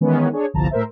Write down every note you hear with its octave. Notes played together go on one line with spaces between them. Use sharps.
D#3 E3 G#3 B3 C#4
D4 G#4 C#5
G1 C2 D3 F3 A5 A#5
A2 A#4 C5 E5